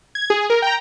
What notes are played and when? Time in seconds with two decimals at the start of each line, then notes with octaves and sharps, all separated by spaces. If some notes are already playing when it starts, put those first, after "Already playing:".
0.15 G#6
0.30 G#4
0.50 A#4
0.62 G5 A#5